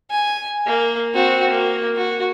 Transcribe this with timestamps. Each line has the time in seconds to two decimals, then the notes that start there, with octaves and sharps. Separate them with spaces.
0.10 G#5
0.66 A#3
1.14 C4 F#4
1.49 A#3
1.96 F#4